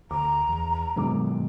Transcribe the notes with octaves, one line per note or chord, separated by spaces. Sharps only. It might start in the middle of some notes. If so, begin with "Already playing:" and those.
D2 A#5 D6
E2
G2 B2 D#3 F#3 G#3 D6